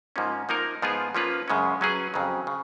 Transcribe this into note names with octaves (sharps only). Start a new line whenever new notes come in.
G#2 F3 A#3 C#4
F3 A#3 D#4 A#4
G#2 F3 B3 F4 G#4
F3 A#3 C#4 F4 B4
F#2 C#3 G#3 C#4
F#3 C#4 G#4 B4
F2 C#3 F#3
C#3